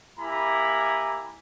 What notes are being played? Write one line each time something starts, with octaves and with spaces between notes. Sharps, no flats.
A#3 E4 G4 G#5 A#5 B5